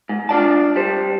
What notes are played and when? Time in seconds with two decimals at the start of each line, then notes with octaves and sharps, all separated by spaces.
0.09 G#2
0.29 D4 F4 D5 A5
0.76 G3 C5